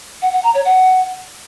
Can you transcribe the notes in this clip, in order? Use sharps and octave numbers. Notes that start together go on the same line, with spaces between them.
F#5
F#5
A#5
C#5
F#5